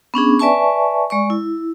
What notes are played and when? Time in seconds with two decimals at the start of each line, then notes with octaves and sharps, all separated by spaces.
0.14 B3 C#4 D4 G#4
0.39 B4 D5 E5 G#5 A5 C#6
1.10 G#3 D5 C#6
1.30 E4